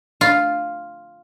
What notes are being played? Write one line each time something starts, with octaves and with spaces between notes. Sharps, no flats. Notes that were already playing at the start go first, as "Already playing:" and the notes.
F4